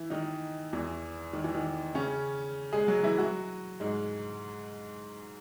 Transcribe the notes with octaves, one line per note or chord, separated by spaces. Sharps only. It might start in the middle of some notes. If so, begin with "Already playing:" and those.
Already playing: E3 E4
D#3 D#4
E2 E3
D#3
E3
D#3
C#3 C#4
G#3 G#4
F#3 F#4
E3 E4
F#3 F#4
G#2 G#3